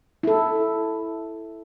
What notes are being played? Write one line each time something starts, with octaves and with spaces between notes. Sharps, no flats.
E4 A4